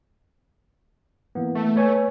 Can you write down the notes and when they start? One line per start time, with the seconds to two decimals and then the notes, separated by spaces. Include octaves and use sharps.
1.35 E3 A#3 B3
1.55 A3
1.76 B4 C#5 G#5